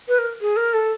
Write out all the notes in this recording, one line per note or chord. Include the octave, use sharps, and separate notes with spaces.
B4
A#4
G#4
A#4
A4